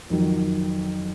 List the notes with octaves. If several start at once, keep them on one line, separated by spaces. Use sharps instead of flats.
F2 D#3 F#3